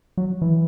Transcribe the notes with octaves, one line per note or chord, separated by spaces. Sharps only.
F#3
E3